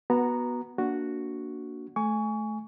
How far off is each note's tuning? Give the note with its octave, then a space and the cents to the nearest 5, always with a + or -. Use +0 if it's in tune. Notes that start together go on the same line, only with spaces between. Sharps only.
B3 -15 F#4 +0 A#5 +0
A#3 +0 D4 -10 F#4 +0
A3 -20 G#5 +0 C#6 +25